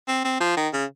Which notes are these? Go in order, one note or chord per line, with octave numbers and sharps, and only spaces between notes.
C4
C4
F3
D#3
C#3